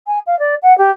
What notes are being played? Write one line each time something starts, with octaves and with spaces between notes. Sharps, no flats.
G#5
F5
D5
F#5
G4